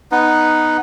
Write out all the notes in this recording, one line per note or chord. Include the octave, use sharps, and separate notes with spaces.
B3 D#4 B4